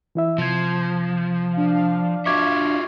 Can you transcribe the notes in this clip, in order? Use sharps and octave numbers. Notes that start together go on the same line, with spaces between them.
E3 E4 E5
C3 F3 G#6
D4 F5
F4 F#4 E5 C#6 D6 G#6